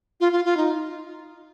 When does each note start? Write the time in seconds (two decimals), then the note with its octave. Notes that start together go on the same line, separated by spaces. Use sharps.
0.20 F4
0.32 F4
0.45 F4
0.57 D#4